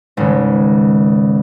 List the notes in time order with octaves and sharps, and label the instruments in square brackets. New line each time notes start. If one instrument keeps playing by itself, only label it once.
[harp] G#1 C#2